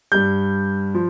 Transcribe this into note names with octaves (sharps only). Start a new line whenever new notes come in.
G2 G3 G6
F3